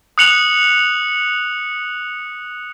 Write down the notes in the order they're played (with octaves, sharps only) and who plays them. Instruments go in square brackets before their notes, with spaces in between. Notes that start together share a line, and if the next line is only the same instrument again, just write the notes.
[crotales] D#6 F#6 C#7 F7 F#7